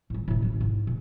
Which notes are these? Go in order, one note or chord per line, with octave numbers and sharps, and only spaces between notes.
A2 G3
A2 D3
A1 C#4
G#2
A#2